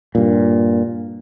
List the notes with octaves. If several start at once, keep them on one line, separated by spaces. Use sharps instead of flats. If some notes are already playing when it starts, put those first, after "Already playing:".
G2 A#2